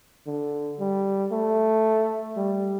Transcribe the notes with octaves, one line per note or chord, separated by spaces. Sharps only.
D3
G3
A3
G3